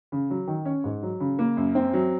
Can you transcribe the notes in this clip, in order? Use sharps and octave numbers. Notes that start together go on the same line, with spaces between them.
C#3
F#3
D#3
C#4
G#2
F#3
C#3
A#3
F#2
C4
F#3